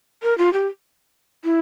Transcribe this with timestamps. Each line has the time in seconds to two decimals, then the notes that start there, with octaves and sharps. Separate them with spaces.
0.23 A#4
0.38 F4
0.53 G4
1.44 E4